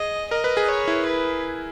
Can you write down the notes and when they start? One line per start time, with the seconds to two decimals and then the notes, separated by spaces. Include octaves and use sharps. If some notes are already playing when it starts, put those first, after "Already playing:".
Already playing: G#4 D#5
0.31 A#4 D#5
0.44 B4
0.57 G#4
0.68 C#5
0.88 E4
1.06 B4